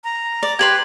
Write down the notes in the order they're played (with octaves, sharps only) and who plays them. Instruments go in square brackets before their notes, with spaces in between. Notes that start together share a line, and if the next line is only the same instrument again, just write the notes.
[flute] A#5
[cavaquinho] D5
[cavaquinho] G4 B4 C6 [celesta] G#6 F#7